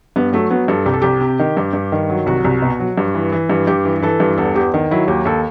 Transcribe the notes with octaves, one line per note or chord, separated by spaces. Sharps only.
G2 B3
F#3 A3
F#3 B3
G2 A4
C2 G4
A4
C2 G4
C3
D#3
G2
G2
D#3
F#3
C2 F#4
C2
B2
F#3
G2
E3
E3
G2
G2 G4
E3
E3 A4
G2
E2 A4
E2 G4
D#3
F#3 E4
D#2 G4
D#2 A4